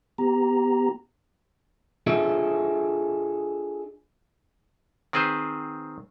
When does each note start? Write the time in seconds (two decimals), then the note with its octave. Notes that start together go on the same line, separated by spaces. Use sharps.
0.18 B3 G4 A#5
2.07 D4 F4 G#4 A4 D#5 E5
5.13 D#3 C4 G#4 B4 C5